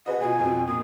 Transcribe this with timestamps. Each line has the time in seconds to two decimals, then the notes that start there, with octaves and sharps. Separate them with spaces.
0.06 G#4 B4 D#5 F#5
0.20 B2 F4 G#5
0.40 F2 B2 F3
0.68 A#2 D#6